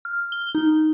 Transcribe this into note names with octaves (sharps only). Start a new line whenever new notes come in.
F6
G7
D#4